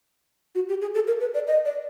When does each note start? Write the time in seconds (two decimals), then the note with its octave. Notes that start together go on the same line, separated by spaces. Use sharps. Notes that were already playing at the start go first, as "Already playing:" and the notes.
0.55 F#4
0.69 G4
0.81 G#4
0.95 A4
1.07 A#4
1.21 B4
1.34 D5
1.47 D#5
1.65 D5